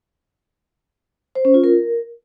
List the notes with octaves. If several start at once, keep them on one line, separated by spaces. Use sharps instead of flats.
C5
C#4
F4
A#4